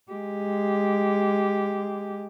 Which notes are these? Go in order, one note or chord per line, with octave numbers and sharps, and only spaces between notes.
G#3 G4